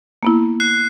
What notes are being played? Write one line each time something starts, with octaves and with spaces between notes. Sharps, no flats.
A#3 B3 E4
F#6 C7